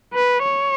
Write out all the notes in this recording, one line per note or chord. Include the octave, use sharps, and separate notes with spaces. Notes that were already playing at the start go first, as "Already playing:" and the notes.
B4
C#5